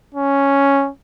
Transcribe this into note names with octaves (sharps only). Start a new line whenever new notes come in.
C#4